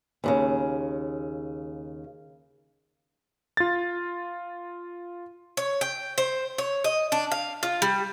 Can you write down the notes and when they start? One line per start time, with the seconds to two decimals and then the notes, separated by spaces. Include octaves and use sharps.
0.24 D#2 A2 C#3
3.57 F4 A6
5.57 C#5
5.81 G5
6.18 C5
6.58 C#5
6.84 D#5
7.12 D4
7.32 F5
7.63 F4
7.82 G3